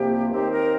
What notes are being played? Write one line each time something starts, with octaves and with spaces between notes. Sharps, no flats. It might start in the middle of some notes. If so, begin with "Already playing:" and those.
Already playing: C2 C3 F3 A#3 G4
D#2 D#3 C4 D#4 G4
A#4